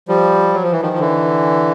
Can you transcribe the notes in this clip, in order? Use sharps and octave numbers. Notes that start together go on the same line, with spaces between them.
F3 G3
F#3
F3
E3
D#3 F3
F3
D3 E3